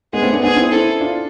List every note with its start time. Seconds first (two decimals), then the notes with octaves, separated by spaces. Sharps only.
0.13 G#3 B3 G#4
0.22 A3 C4
0.33 B3 D4
0.43 B3 D4 G#4
0.56 C4 E4
0.71 C4 E4 A4
1.00 D4 F4